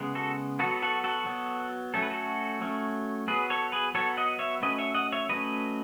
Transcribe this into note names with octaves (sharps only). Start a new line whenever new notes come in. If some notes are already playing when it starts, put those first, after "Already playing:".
Already playing: C#3 G#3 B3
F#4 A4
F#3 B3 F#4 A4
F#4 A4
F#4 A4
F#3 B3
F#3 A3 C#4 A4
B4
F#4 A4
F#3 A3 C#4
F#3 B3 G#4 B4
A4 C#5
G#4 B4
F#3 B3 A4 C#5
D#5 F#5
C#5 E5
F#3 A3 C#4 B4 D#5
C#5 E5
D#5 F#5
C#5 E5
F#3 A3 C#4 B4 D#5